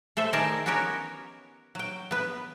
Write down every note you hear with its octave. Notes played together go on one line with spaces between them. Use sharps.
A3 A4 C5 E5
D#3 D#4 G#4 A#4 D5 A5
B3 C#4 F#4 G4 A#4 C#5
F#3 G5
B3 B4